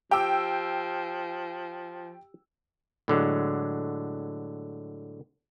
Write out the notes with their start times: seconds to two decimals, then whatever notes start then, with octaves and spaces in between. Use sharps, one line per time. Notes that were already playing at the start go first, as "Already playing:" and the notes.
0.11 F3 G4 G5 E6
3.08 A2 D3 F#3 G#3